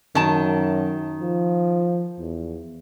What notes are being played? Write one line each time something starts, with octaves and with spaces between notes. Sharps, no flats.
F#2 D#3 A5
F3
E2